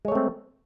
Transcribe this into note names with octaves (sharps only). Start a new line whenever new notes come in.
G#3 A3 C4 C#5